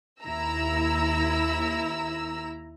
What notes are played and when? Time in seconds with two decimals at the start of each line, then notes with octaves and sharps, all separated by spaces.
0.23 D#2 E4 A#5 E6